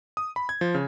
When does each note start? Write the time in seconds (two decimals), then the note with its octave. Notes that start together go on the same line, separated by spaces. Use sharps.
0.17 D#6
0.36 B5
0.49 G#6
0.61 F3
0.75 C#3